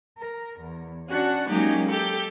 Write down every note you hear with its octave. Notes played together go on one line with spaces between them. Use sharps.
A#4
E2
C#4 D4 F#4 F#5
F#3 G#3 A#3 C#4 D#4 G4
G4 A4 G6